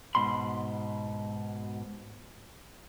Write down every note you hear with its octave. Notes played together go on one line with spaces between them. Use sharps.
G#2 B2 B5 C6